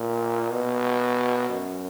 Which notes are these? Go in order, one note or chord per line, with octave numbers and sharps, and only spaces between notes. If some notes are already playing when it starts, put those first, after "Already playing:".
Already playing: A#2
B2
F#2